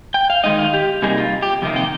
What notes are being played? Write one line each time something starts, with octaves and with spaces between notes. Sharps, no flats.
G5
F5
D#3 G#3 D#4 D#5
F5
G4
C3 G3 A#3 D#4 G#4
F4
G4
F2 C3 D#3 A#3
G5